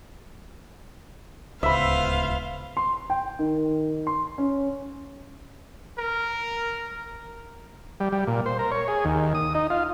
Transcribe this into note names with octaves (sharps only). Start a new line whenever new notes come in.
D1 C#2 B3 C5 E5 F5 B5
C6
G5
D#3
C6
C#4
A#4
G3
G3
A#2
C5
A#4
C#5
G#4
D#2
D#6
D#4
F4